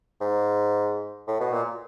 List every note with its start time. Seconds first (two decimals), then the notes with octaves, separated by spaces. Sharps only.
0.21 G#2
1.27 A2
1.40 B2
1.53 A#2